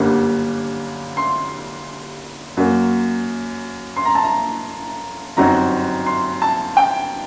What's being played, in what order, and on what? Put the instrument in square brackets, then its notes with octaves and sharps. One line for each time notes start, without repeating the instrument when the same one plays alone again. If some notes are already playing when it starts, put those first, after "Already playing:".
Already playing: [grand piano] G1 F#2 D3 G3 A#3
C6
F#2 F#3 A#3
C6
A#5
A5
A#5
G1 F#2 F#3 C4 D#4 A#5
C6
A5
G5